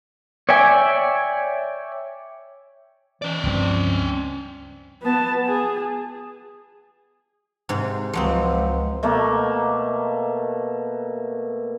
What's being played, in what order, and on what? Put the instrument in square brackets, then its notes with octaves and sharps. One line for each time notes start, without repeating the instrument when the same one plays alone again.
[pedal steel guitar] C#5 D5 E5 G5 G#5
[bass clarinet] E3 [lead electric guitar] C#4 D5
[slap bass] C#2 G2 F3 [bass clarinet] C4
[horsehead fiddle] B3 A5
G#4
[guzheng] G#2 C3
[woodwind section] C#2 [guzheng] F3 F#3 C4
[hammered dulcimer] B2 A3 A#3